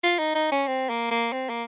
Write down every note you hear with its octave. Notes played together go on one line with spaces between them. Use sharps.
F4
D#4
D#4
C#4
C4
A#3
A#3
C4
A#3